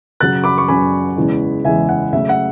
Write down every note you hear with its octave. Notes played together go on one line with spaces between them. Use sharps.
F#2 C#3 F#3 F#6 A6
B5 D6
C#6
F#2 C#3 F#3 G#5 B5
E2 C#3 E3 G#3
E2 C#3 E3 G#3 E5 G#5
F#5
C#3 F#3 A3 E5
F#5